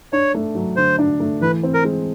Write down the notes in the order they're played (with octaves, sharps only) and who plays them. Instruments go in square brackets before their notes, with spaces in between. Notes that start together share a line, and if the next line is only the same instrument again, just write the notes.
[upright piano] D4 [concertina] C#5
[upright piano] A3
F#3
[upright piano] D3 [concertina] C5
[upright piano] D4
A3
[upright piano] E3 [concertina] B4
[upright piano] C4
[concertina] A#4
[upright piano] G#3